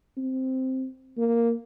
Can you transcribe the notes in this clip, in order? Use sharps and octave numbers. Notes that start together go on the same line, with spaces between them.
C4
A#3